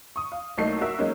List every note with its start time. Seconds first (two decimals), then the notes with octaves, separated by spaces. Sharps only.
0.16 C#6 D#6
0.32 F5
0.58 C2 F#3 A3 A#3 D#4 C7
0.81 F#4 A#4 E5 E6
0.98 F#3 G#3 A#3 C#4 D#4